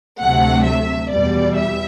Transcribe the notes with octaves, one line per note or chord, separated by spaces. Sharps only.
D2 C3 F#3 A3 F#5
E5
E2 B2 G3 D5
E5